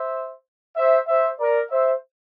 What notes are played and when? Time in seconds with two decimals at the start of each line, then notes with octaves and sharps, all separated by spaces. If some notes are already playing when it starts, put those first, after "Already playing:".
Already playing: C5 E5
0.76 C5 E5
1.07 C5 E5
1.39 A#4 D5
1.70 C5 E5